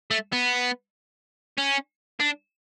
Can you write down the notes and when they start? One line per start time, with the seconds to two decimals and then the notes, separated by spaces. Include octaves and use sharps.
0.11 A3
0.33 B3
1.58 C#4
2.20 D4